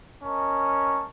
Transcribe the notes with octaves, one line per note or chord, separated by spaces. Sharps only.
C#4 A#4 D#5 A5 C#6